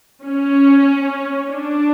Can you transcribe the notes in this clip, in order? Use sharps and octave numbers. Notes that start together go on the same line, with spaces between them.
C#4
D4